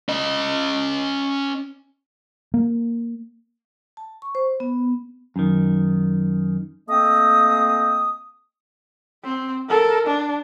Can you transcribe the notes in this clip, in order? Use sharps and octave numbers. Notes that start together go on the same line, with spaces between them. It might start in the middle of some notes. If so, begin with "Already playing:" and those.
C#4 D#5
A#3
A5
C#6
C5
B3
F#2 D#3
A3 A#3 C4 D#5 D#6
C4
A4 A#4
D4